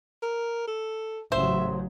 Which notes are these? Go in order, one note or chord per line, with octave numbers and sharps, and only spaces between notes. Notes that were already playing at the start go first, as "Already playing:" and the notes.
A#4
A4
A1 C#3 F#3 C5 E5